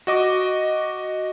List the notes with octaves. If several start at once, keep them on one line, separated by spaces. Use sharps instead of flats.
F#4 D#5 D6